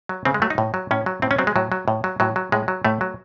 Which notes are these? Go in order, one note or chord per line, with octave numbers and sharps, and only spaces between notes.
F#3
C#3 C4
G#3
F#3 A3
D#4
A2
F#3
A2 C#4
F#3
A2 C4
C#4
F#3 C4
G#3
A2 F#3
F#3
A2
F#3
A2 F#3
F#3
A2 G#3
F#3
A2 A3
F#3